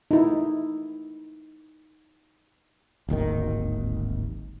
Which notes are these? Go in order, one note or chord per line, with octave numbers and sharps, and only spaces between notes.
D#4 E4
D1 G#1 D#2 D#3